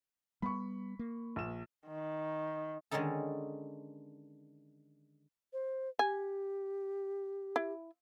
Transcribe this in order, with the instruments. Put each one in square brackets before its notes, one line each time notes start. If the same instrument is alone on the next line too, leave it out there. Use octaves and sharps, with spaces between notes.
[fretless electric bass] G3 B3 [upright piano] B5 C#6
[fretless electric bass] A#3
[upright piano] A#1 E7
[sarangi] D#3
[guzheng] D3 D#3 G#3 C#4 D#4 A4
[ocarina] C5
[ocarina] G4 [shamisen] G#5
[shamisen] E4